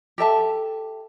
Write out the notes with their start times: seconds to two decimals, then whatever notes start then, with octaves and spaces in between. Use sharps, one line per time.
0.18 G4 A4 E5 A5